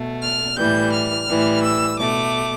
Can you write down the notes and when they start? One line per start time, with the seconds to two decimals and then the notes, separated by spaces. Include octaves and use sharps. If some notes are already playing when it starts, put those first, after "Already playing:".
Already playing: B2 A3
0.21 F6
0.57 A2 E3 G3 G6
0.91 F6
1.27 A2 E3 G3
1.62 E6
1.98 B2 A3 D6